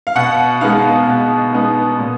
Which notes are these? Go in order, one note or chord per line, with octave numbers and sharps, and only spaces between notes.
F5
B2 F#5
G#3 B3 D#4 F5
B2
G#3 B3 D#4
A#2